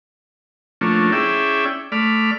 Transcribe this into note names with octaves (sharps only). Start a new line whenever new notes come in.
F3 A3 A#3 C#4 D4
C#4 E4 G#4 D5 E5 G5
A3 D5 B5 F6